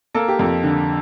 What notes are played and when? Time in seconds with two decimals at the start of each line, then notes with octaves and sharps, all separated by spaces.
0.15 A#3 A4
0.28 G4
0.39 F2 A4
0.63 D3